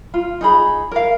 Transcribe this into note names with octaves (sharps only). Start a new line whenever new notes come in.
F4
D#4 G#4 B5
A#4 F5